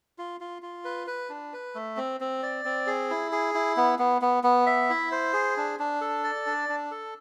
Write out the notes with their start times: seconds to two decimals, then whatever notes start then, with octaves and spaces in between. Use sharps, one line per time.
0.18 F4
0.41 F4
0.62 F4
0.85 B4
1.07 B4
1.30 D4
1.53 B4
1.75 A3
1.97 C4
2.20 C4
2.43 D5
2.65 C4
2.87 G#4
3.10 E4
3.32 G#4
3.55 E4
3.77 B3
3.99 B3
4.22 B3
4.44 B3
4.67 E5
4.90 E4
5.12 C5
5.33 G#4
5.57 D4
5.79 D4
6.01 A4
6.24 D5
6.46 D4
6.69 D4
6.91 A4